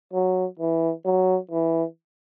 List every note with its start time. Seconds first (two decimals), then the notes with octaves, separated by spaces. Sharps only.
0.13 F#3
0.59 E3
1.05 F#3
1.51 E3